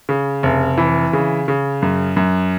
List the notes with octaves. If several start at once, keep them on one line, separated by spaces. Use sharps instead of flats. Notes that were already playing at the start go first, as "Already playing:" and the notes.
C#3
F1
E3
C#3
C#3
F#2
F#2